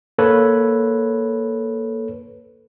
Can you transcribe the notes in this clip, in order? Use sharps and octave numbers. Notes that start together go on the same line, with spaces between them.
A#3 A4 B4 C#5